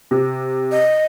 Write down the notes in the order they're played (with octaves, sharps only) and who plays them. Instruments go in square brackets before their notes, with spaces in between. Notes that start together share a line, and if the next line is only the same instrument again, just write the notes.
[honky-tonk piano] C3
[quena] D#5